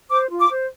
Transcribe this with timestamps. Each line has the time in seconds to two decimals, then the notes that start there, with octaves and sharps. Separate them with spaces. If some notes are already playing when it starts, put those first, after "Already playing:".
0.09 C5 D6
0.29 F4
0.39 D6
0.49 C5